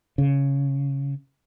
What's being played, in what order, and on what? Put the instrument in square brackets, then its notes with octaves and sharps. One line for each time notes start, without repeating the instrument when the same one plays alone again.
[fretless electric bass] C#3